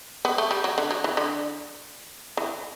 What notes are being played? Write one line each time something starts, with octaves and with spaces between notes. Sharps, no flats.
B3
A3
G3
F#3
D3
F#3
E3
D3
E3